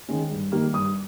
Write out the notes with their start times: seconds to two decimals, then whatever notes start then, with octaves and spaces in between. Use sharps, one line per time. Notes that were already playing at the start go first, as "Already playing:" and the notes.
0.09 D#3 G#3 C#4
0.31 G2
0.52 D#3 G3 A#3
0.73 G2 D#6